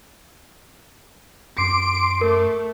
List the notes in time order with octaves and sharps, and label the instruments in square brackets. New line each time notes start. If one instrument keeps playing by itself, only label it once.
[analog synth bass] F#2 [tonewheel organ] C6 D6 [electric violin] D7
[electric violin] A3 [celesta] A#4